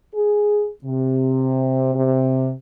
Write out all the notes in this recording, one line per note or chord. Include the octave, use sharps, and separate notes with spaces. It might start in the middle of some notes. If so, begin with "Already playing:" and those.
G#4
C3
C3